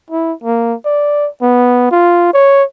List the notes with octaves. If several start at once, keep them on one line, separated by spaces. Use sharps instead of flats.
E4
A#3
D5
B3
F4
C#5